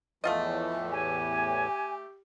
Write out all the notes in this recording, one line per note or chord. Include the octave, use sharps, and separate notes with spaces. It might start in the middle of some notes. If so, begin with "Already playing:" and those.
E2 A2 E3 F3 A3 F4 D#5
G4 G#5